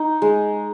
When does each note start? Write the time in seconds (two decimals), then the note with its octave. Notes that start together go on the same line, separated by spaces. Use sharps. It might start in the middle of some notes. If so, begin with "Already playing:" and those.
Already playing: D#4
0.22 G#3